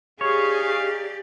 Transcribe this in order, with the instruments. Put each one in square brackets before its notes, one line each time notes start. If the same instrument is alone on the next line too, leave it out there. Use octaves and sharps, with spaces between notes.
[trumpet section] D#4 F5 [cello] G4 D5 [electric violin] G#4 [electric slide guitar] C#5